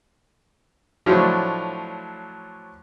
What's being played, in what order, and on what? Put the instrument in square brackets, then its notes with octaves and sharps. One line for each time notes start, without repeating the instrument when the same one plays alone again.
[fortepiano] A2 F3 F#3 D4